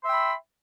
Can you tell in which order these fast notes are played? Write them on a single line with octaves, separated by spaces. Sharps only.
C6 E5 E6 G5 B5